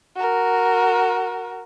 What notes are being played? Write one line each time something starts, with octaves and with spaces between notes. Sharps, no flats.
F#4 A#4